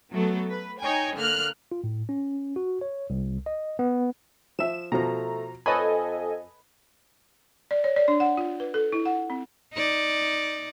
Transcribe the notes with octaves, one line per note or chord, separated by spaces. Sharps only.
F#3 A3 B3 A4
B4
D#4 C#5 G5 G#5
D3 A#3 F6 F#6
F4
A2
C#4
F#4
C#5
C2
D#5
B3
F3 E5 E7
B2 F3 A3 A#5
F2 A4 B4 C#5 D#5 G#5 B5
D5
C#5
D5
D4
F#5
F4
B4
A4
E4
F#5
C4
D#4 D5